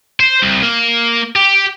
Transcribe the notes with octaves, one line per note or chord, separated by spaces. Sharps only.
C5
C2
A#3
G4